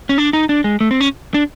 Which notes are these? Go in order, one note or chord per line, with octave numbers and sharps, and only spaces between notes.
C#4
D4
D#4
D4
G#3
A3
C4
C#4
D4